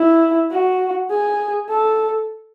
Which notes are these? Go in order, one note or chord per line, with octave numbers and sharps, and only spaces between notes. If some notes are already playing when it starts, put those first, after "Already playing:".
Already playing: E4
F#4
G#4
A4